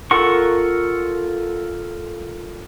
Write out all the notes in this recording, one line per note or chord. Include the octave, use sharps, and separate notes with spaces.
F4 A4 A#4 F#5 C#6